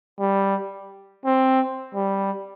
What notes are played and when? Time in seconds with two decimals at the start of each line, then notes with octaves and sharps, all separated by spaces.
0.19 G3
1.25 C4
1.95 G3